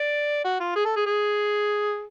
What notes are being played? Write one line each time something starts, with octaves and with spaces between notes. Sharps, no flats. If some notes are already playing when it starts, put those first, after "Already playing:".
Already playing: D5
F#4
F4
G#4
A4
G#4
G#4